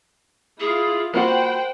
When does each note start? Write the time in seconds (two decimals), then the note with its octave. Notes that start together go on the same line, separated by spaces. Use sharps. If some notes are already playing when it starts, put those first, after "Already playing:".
0.60 E4 F4 G#4
1.14 A#3 F4 F#4 C5 F#5 G5 B5